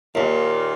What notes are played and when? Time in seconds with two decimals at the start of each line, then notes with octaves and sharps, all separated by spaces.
0.15 D#2 A#2 D#3